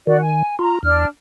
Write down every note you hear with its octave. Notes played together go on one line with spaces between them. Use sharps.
D#3 F#4 D5
G#5
F4 A#5
E2 D4 F6